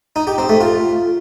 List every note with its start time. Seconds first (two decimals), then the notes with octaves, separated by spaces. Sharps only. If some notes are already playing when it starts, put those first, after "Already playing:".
0.16 D#4
0.27 G4
0.38 C4
0.49 A3
0.61 F4